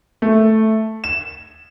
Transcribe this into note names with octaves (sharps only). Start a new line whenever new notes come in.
A3
E7